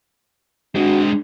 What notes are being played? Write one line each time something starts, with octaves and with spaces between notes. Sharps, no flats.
G#3 C4 D4 F#4